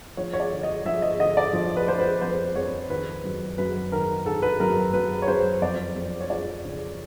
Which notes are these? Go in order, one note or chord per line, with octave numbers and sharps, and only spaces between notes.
F3 C#5
C#5
D5
D3
D#5
F3 E5
D#5
D3 D#5
D5
F3
B4
F3 C5
B4
F2 C5
F2 C#5
D#3 B4
F#2
F#2 B4
D#3 A#4
D#3 A4
B4
F#2 A#4
F#2 B4
C#5
F#2 C5
F2 D5
F2
C#5
F3 D5
C#3